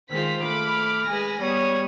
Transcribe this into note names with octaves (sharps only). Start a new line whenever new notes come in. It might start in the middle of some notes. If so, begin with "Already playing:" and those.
D#3 G#3 F4 C5 B6
A3 B5 D6 F6
G#3 B4 G#5 A#6
G3 B3 C#5 D#6